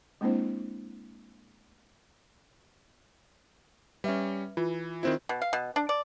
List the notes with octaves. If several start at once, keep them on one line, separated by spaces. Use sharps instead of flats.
G#3 A#3 C4 D4 E4 C5
G3 C#4 B4 E5
E3 F4
D#3 C4 E4 F4 C5
B2
F5
B2
D4
D5